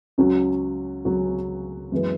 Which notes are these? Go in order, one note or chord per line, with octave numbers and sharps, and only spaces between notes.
C#2 C#3 F#3 C#4 F#4
C#2 C#3 F#3 C#4 F#4
F#2 E3 G#3 B3